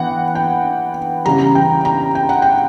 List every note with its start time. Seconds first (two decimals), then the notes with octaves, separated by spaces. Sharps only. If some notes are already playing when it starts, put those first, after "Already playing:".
Already playing: E3 B3 F#5 G5
0.35 G5
1.25 C#3 E3 G3 A#5
1.55 G5
1.85 A#5
2.15 G5
2.29 F#5
2.42 G5